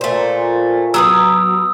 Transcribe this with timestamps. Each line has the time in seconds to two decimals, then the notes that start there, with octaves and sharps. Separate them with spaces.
0.01 A#2 A3 C5
0.94 F#3 B3 B4 D#6 E6